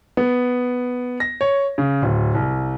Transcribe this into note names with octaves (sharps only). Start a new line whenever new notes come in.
B3
A#6
C#5
C#3
D1
C2